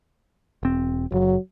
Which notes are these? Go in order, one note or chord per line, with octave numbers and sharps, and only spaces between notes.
E1 C4
F#1 F#3